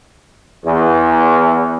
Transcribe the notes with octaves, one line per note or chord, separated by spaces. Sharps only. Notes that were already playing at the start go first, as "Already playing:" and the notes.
E2